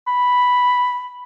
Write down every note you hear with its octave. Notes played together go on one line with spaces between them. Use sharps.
B5